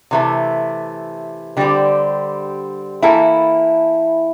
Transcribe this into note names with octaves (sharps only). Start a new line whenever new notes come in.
C3 E3 A3
D3 G3 C4 G4
E3 A#3 E4 A4